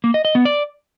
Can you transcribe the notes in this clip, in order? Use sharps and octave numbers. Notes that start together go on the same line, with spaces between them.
A#3
D#5
D#5
B3
D5